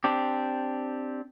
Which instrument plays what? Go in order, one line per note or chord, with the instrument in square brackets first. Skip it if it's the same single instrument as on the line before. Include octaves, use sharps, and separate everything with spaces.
[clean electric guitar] C4 D4 G4